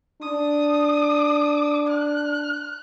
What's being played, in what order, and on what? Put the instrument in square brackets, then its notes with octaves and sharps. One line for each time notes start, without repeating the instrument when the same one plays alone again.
[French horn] D4 [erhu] D#6
[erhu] F#6